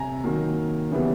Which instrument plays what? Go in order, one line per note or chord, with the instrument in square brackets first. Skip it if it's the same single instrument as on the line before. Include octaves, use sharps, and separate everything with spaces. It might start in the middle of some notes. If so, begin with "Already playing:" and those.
Already playing: [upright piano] C3 G#5 A#5
D#3 F#3 A#3
C#3 E3 G3 B3